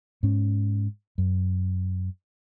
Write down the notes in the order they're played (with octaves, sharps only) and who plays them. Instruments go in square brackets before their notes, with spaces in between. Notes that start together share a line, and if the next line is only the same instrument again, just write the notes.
[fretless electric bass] G#2 C#4
F#2